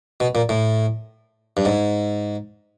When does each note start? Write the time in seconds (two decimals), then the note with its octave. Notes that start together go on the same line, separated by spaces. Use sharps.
0.20 B2
0.35 A#2
0.49 A2
1.57 G2
1.65 G#2